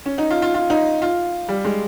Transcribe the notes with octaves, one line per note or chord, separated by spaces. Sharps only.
C#4
D#4
F4
F4
F4
D#4
F4
G3
G#3